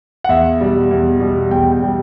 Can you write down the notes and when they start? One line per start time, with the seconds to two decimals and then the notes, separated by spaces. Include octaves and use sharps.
0.24 F#5
0.29 E2 E5
0.60 B2 G3
0.91 E2
1.20 B2 G3
1.51 E2 G5
1.72 G5
1.82 B2 G3